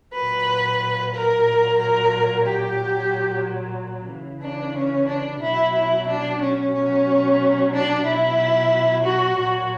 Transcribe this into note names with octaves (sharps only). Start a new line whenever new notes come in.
F#3 B4
A#2
A#4
A#2 F#3
A#4
G4
A#2 F#3
C#3 E3
D4
C#4
D4
B2 F#3 E4
E4
D4
C#4
B2 F#3 C#4
D4
B2 F#3 E4
F#4
A#2 F#3 F#4